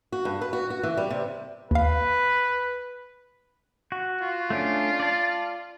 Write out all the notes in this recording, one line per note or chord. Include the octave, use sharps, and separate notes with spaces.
F#4
G2
B4
F#4
F#4
E3
G3
C3
D#2 B4 F5
F#4
F4
A3 C#4 D4
D5 A5